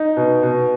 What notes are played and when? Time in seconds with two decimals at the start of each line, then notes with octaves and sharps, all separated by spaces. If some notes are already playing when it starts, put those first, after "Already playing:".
Already playing: D#4
0.17 B2
0.43 B2